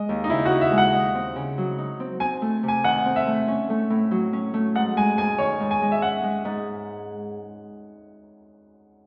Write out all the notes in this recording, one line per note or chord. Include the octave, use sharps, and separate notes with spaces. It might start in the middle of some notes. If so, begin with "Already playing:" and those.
Already playing: G#3 D#5
D#2
D#4
C#3 E4
F#4
D#4
E5
G#3
F#5
D#4
C4
C#3
F#3
D#4
C4
C4 G#5
A3
C3
G#5
D#3 F#5
C4
E5
A3
C#4
A3
A2
F#3
C#4
A3
G#2 F#5
G#3 G#5
G#2 G#5
D#3 C#5
G#2
G#5
G#3
E5
C#4 F#5
G#3
G#2